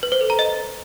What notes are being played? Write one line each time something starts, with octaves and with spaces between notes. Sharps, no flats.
B4
C5
A4
A#5
D#5